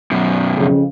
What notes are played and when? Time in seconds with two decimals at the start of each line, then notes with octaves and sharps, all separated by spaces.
0.11 F#2 B2
0.56 F2 C#3